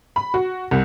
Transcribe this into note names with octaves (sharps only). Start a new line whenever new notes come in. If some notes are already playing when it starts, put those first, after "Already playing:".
B5
F#4
C2